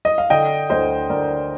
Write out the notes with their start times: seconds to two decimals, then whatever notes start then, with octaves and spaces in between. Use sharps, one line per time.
0.05 D#5
0.18 F5
0.30 D3 D#5 G5
0.70 D2 C5 D#5
1.09 D2 A#4 D5